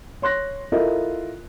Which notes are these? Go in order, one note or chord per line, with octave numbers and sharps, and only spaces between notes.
C#5 C6 F#6 A#6
E4 F4 A4 A#4 D#5 E5